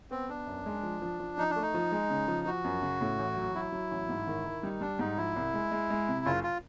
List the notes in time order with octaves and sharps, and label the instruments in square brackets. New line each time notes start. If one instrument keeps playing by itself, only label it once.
[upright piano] B3 [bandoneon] C4
[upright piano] B3 [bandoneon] D4
[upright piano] F#2
G#3
F3
F3
F3
[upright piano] F3 [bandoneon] D#4
[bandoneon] D4
[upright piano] A3
[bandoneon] D#4
[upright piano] F3
G#3
C#3
F3
[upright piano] F3 [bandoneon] F#4
[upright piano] F#2
C#3
A2
A1
F#3
[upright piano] F#3 [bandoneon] E4
[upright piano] F#3
A1
G#2
D#3
D#3
[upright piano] G3 [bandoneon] D#4
[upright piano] G3 [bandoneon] D4
[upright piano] G#2 [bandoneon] D#4
[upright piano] F3 [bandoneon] E4
[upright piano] C2
G#3
G#3
G#3
C3
[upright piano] F#1 [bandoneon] F4
[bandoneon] F4